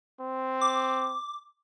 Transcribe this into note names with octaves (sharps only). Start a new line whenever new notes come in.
C4
D6